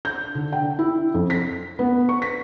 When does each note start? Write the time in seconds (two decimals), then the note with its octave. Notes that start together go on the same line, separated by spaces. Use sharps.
0.05 G6
0.35 D3
0.52 G5
0.79 E4
1.14 F2
1.30 B6
1.79 B3
2.09 C#6
2.22 B6